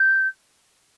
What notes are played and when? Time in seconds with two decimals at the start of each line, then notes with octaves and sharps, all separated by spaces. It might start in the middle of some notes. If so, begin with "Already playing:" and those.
Already playing: G6